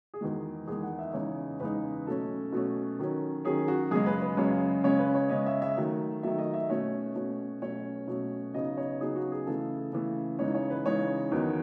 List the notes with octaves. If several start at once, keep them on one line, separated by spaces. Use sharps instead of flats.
G#4
E2 D#3 G#3 F#4
E2 D#3 G#3 G#4
F#5
E5
E2 C#3 G#3 D#4 C#5
E2 C#3 G#3 D#4 B4
B2 F#3 A3 C#4 A4
B2 F#3 A3 C#4
D#3 F#3 C#4
D#3 F#3 C#4 G#4
F#4
F#2 C#3 G#3 G#4
B4
B4
F#2 C#3 G#3 C#5
C#3 G#3 C#4 C#5
B4
C#5
C#3 G#3 C#4 D#5
E5
E5
D#3 F#3 A3
D#3 F#3 A3 E5
D#5
E5
B2 A3 C#4 C#5
B2 A3 C#4
B2 F#3 A3 C#4 C#5
B2 F#3 A3 C#4
C#3 F#3 B3 D#4 D#5
C#5
C#3 F#3 B3 D#4 G#4
F#4
G#4
C#3 E3 A3 A4
C#3 E3 A3
C#3 E3 G#3 D#4 C#5
C#5
B4
C#3 E3 G#3 D#4 C#5
E2 D#3 F#3 B3 D#4